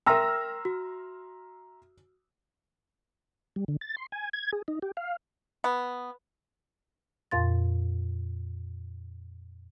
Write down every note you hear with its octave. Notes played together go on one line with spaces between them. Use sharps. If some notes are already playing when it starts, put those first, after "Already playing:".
A#4 E5 G5 A#5 C6 E6 F6 A#6
F#4
G3
D3
A6
C6
G#5
G#6
G#4
D#4
G4
F5
B3
F2 A#2 F5 C6 A6